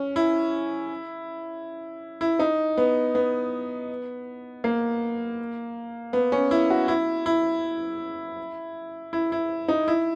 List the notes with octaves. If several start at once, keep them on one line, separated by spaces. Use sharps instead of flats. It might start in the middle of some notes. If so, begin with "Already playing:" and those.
Already playing: C#4
E4
E4
D#4
B3
B3
A#3
B3
C#4
E4
F#4
E4
E4
E4
E4
D#4
E4